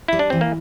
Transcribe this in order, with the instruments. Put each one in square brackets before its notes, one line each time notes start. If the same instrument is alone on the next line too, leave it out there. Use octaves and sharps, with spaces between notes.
[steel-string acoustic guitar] G3 [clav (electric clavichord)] E4
[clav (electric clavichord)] D4
[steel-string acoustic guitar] E3 [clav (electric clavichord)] C4
[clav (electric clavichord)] A#3